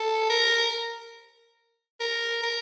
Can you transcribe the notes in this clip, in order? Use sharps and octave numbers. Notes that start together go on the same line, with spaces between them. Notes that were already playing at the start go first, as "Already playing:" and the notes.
Already playing: A4
A#4
A#4
A#4